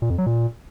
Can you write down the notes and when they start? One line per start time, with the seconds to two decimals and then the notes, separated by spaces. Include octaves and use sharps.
0.02 A#2
0.10 F2
0.18 F#3
0.26 A#2